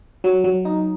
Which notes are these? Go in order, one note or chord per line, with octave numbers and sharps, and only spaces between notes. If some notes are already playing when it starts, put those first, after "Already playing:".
F#3
F#3
D#4